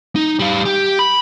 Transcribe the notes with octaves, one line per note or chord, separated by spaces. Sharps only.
D#4
G3 F5
G4
B5